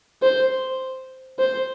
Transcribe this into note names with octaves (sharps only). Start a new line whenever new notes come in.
C5
C5